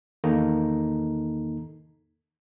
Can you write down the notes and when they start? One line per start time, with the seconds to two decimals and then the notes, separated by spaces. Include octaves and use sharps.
0.24 E2 D#3 A#3 D#4 A4 A#5